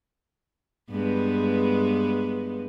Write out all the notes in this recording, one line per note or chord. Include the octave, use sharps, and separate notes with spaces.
G2 G#3 B3